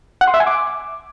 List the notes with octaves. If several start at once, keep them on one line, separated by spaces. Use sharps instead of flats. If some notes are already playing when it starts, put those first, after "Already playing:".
F#5
C6
E5
G#5
D6